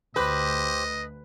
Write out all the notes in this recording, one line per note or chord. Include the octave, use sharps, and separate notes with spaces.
D2 G4 B4 C5 D#5